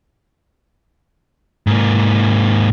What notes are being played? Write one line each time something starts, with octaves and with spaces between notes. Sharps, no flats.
G#2 A#3